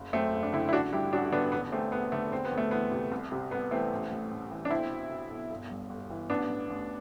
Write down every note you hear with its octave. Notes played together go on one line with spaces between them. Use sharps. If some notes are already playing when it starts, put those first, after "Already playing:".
Already playing: F#1
F#2 A3 C4
F#1
D4
D3 C4 E4
E4
A1 D4 F#4
G2 E4 G4
A1 D4 F#4
D3 B3 D4
E1 B3
E2 A3 C4
E1 B3
D3 A3
E1 C4
B3
D2
A3
E3 B3
C3
C2
C3
C2 B3
E3 A3 C4
A1
A2
A1
E3
D4
B1 C4 E4
B2
B2
B1
G1
G2
G1
E3
A1 B3 D4
A2
A1